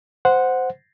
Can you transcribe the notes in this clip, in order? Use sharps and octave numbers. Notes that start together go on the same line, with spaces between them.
C5 F#5